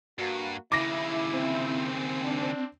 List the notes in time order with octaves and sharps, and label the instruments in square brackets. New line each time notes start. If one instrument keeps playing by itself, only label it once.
[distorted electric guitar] G2 [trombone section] A#3 F#4
[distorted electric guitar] D#2 C#3 [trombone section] E4 [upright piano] D6 A#6
[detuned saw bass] C4
[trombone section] D4